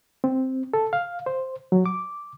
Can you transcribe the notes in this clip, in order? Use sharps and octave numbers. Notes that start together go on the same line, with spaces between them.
C4
A4
F5
C5
F#3
D6